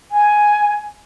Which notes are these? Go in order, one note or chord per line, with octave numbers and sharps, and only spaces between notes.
G#5